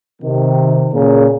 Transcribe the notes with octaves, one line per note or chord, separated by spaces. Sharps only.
C3 D#3
A#2 C#3